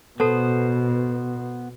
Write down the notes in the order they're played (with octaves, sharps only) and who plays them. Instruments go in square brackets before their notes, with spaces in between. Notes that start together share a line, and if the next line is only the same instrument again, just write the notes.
[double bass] B2 [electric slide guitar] B3 C5 [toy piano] A4 A5